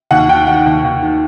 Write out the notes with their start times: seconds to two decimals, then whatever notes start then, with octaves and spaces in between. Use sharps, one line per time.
0.11 D#2 F#5
0.29 D#3 G5
0.47 D#3 F#5
0.66 D#2
0.84 D#2
1.02 D#3